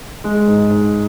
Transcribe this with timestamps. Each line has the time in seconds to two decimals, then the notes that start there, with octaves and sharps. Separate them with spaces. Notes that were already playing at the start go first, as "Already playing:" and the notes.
0.24 G#3
0.48 G#2
0.70 G#2